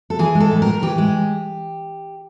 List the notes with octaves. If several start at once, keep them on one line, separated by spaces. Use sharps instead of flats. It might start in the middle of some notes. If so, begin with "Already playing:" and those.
A4
E3 G#4
G#3
A4
A2
A#4
A2
E3 G4
G#3